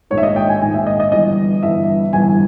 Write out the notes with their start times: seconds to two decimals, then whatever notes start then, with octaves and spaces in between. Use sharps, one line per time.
0.10 A#1 G#2 D#3 C#5
0.18 E5
0.23 D#5
0.36 G5
0.49 G#5
0.61 A#1 G#2 D#3 G#5
0.74 E5
0.87 D#5
1.00 D#5
1.12 G1 G2 E3 D#5
1.63 G1 G2 E3 E5
2.13 G1 G2 E3 G#5